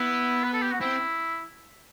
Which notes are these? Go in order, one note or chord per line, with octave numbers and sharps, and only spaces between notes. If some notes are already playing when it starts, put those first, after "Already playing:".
Already playing: B3 E4
B4
A4
G4
F#4
C4 E4